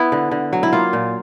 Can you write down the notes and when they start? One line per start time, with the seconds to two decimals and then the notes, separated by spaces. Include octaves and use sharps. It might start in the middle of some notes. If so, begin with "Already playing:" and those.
Already playing: B3 E4
0.12 D3
0.31 D3
0.53 F#3
0.63 E4
0.73 A#3 F4
0.93 A#2